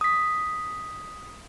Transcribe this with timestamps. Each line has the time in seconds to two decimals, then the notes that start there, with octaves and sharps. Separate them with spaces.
0.01 D#6 B6